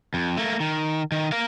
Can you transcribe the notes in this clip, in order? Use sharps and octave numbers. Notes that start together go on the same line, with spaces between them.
F2
A3 A#3
D#3
D#3
A#4 F5